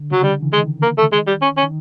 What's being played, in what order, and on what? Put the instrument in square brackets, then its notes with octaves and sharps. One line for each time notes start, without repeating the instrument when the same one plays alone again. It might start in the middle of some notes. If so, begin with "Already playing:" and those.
Already playing: [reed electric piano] D3
[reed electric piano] C#3 [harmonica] F#3
[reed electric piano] D3 [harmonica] G3
[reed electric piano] E3
[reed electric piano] D#3 [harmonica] G#3
[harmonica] A#3
A3
G#3
G3
C#4
C#4
[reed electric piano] D#3